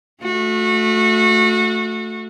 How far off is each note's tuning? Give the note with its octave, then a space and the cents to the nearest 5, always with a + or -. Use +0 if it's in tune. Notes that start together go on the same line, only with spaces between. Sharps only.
A3 +0 F#4 -30